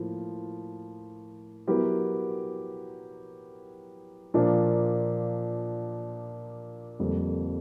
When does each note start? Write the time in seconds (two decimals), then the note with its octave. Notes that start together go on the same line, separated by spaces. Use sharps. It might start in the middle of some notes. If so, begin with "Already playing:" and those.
Already playing: A2 F3 A#3 F4
1.67 F#3 B3 E4 G4 A#4
4.34 A#2 F3 A#3 D4
6.99 F2 D3 G3 A#3